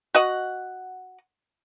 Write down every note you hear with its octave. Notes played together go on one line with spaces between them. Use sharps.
F#4 D#5 F#5